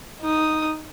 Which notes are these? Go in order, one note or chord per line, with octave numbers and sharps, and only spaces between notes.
D#4 D#6